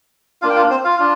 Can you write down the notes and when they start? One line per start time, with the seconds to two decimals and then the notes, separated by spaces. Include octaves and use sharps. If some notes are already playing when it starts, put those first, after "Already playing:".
0.42 A#3 D4 F4 F5
0.50 G5
0.56 F4 F5
0.70 C4 C5
0.84 F4 F5
0.99 D4 F4